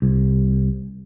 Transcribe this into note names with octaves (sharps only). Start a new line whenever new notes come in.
C2